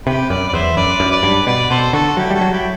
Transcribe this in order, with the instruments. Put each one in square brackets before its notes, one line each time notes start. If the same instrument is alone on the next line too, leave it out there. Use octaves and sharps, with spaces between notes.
[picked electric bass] C3 [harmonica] G4 B4
[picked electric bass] F#2 [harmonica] B4 D5
[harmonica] D5
[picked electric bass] E2 [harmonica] C5 E5
[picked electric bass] F#2 [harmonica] B4 D5
[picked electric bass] F#2
[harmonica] B4 D5
[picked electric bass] G2
[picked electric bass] B2 [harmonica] B4 D5
[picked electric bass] B2 [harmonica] A4 C5
[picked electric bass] D3 [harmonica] F#4 A4
[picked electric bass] F#3 [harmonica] E4 G4
[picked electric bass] G3 [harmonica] F#4 A4
[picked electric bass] F#3
[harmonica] E4 G4